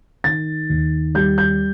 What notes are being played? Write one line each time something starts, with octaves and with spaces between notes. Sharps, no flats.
D#3 A6
D#2
G3 G6
G6